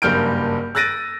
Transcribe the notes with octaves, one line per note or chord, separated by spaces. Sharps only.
F#1 G2 A#3 F6 G6 D7
E6 F#6 A6 A#6 D7 D#7